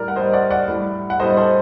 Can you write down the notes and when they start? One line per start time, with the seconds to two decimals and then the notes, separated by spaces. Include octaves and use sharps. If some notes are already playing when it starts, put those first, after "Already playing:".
Already playing: A2 G3 A#4 D5
0.08 F#5
0.16 A2 C5 D#5
0.20 G3
0.33 D5 F#5
0.51 D5 F#5
0.68 A2 G3
1.10 F#5
1.20 A2 G3 C5 D#5
1.37 A4 C5